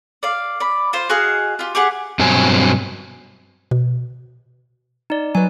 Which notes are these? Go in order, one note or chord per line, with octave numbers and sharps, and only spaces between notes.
D5 F5
D5 B5
F4 C5
F#4 G#4 D#5 F5
F4 G4
G4 G#4 F#5
G2 B2 F#3 C4 G#5
B2
D#4 D5
F#3 B4 G#5